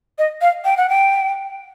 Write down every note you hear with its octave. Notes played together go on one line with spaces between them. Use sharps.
D#5
F5
G5
F#5
G5